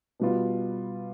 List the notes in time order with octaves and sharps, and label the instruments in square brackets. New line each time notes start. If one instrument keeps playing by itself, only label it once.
[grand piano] B2 G3 B3 F4